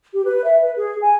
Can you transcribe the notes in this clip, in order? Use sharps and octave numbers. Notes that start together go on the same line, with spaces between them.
G4
B4
E5
B4
G#4
G#5